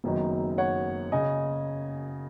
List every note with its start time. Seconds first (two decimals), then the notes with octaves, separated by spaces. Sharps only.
0.04 F#1 F#2 D#3 B3 D#4
0.58 C#5 F#5
1.12 C#3 D#5 G#5